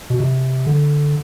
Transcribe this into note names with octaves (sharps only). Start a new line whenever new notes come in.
B2
C3
D3